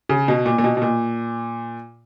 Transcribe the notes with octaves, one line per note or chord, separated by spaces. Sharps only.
C#3
B2
A#2
A#2
B2
B2
A#2